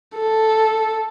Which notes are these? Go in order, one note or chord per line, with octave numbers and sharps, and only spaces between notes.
A4